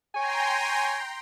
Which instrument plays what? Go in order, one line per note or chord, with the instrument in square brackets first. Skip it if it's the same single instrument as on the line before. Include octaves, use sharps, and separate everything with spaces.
[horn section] C#5 G#5 [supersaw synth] G5 A#5 C6